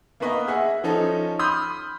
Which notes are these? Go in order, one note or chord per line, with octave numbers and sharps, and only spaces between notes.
A#3 B3 A#4 B4 D#5
G#4 E5 F#5
F3 C#4 D#4 A4
B5 C6 D#6 F6 G6